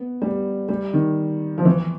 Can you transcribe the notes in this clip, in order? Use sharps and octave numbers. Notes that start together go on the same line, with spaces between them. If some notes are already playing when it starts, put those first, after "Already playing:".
Already playing: B3
G3
G3
D#3
F3
E3